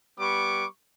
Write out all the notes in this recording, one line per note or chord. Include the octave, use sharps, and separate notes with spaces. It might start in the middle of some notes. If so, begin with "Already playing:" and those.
G3 B3 C#6 D6